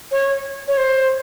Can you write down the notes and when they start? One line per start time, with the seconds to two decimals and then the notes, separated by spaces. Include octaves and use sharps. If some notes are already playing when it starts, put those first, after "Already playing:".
0.12 C#5
0.68 C#5
0.77 C5